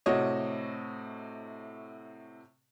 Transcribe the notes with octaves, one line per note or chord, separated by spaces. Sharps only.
A2 C3 F#4 C#5 D#5